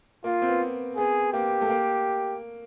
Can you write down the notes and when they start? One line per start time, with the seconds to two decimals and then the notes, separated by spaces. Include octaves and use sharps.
0.24 A#3 F4
0.42 C4
0.49 B3
0.96 B3 G#4
1.33 A#3 G4
1.61 A3
1.70 A#3